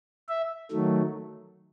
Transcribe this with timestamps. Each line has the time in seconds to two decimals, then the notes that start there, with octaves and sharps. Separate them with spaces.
0.29 E5
0.71 D#3 F#3 A3